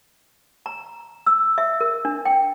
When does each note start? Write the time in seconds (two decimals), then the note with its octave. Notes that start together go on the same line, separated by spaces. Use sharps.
0.66 A#5
1.26 E6
1.58 E5
1.81 A#4
2.05 D4
2.25 G5